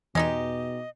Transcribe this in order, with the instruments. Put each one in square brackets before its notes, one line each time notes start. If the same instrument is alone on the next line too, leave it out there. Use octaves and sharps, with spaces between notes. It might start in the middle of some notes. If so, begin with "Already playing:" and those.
[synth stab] E2 [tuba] B2 [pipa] G#3 D#4 G4 [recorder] D#5